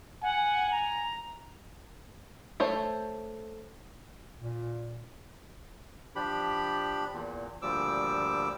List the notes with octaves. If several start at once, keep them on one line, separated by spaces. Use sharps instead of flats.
F#5 G#5
A#5
A3 C5 C#5 A5
A#2
F3 D4 G4 B5
E2 A#2
D2 A#2 F3 G3 D6 E6